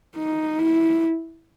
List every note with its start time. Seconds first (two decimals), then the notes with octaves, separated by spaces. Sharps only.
0.17 D#4
0.59 E4